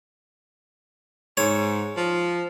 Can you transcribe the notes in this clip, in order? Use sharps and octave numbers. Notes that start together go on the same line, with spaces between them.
G#2 C#5
F3